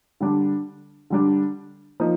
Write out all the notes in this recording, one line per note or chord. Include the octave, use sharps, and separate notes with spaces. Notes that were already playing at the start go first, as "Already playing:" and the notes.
D3 G3 D4
D3 G3 D4
F3 A#3 D#4